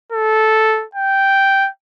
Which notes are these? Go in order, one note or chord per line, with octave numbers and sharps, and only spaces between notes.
A4
G5